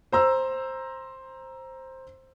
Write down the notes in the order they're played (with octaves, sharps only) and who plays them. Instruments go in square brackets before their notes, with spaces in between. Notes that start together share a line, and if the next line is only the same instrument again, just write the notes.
[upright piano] C5 A#5 E6